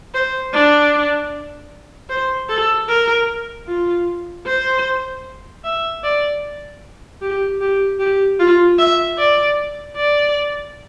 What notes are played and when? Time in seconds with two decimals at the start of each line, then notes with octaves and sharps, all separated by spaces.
0.14 C5
0.53 D4
2.10 C5
2.49 A4
2.89 A#4
3.67 F4
4.46 C5
5.64 E5
6.04 D5
7.21 G4
7.61 G4
8.00 G4
8.40 F4
8.79 E5
9.18 D5
9.97 D5